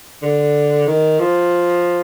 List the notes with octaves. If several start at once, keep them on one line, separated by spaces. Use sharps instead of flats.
D3
D#3
F3